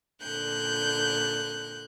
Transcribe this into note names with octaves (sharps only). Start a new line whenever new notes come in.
A#2 D3 F#6 G6